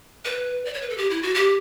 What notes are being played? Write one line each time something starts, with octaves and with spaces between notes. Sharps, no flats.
B4
D5
C#5
B4
A4
G4
E4
F#4
G4